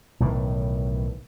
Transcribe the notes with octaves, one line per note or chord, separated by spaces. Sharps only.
B1 A2 D#3 E3